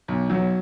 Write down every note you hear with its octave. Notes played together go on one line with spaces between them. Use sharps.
B1
F#3